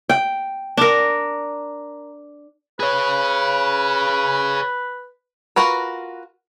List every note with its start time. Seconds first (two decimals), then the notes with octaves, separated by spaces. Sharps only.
0.09 G5
0.77 D4 A#4
2.80 G#4 B4 C#5
5.56 F4 F#4 A#4 B4